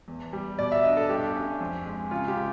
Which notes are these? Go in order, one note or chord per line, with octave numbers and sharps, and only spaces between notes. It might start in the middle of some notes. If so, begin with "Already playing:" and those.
E2
G3
B2 D5
E5
D4 D#5
A4
G2 G4
C#4
F2
G#3
C#3 F4
G4
C#3